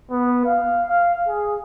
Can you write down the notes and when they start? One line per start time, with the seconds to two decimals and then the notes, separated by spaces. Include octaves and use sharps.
0.11 B3
0.46 F5
0.89 F5
1.28 G#4